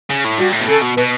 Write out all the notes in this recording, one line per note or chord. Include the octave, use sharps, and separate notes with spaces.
C#3
A2
G2 F#4
A2
B2
C#3 A4
B2
B2 B4